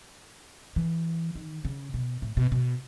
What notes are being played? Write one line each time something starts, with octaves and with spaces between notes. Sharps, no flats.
E3
D#3
C#3
B2
A2
B2
B2